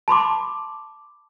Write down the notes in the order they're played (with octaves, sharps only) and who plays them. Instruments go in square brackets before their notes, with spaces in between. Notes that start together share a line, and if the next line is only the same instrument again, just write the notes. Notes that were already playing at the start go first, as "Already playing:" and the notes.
[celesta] A5 B5 C6 D6